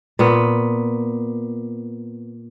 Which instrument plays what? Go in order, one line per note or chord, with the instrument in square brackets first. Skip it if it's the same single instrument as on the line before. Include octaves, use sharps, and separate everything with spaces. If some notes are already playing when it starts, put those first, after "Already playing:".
[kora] A#2 B3